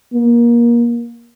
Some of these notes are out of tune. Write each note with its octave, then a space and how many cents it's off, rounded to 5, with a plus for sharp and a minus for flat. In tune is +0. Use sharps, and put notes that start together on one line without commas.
A#3 +25